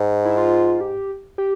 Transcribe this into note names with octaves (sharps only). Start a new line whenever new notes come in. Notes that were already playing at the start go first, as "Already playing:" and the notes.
Already playing: G#2
E4
F4
G4
G4